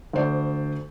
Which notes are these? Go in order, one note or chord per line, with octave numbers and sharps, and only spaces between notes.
D2 C5 D5